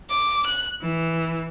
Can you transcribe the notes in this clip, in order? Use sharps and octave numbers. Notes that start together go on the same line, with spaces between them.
D6
F#6
E3